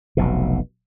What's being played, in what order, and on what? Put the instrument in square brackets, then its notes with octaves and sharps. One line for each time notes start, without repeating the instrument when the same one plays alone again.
[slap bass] F1 B1 B2